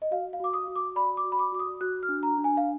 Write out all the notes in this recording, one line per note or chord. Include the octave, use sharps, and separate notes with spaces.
D#5
F#4 F5
F5
F#4 D6
D#6
F#4
D6
D5 B5
D6
F#4
B5
D6
F#4 D6
D#6
F#4 F#6
F6
D4
A#5
D4
G#5
F5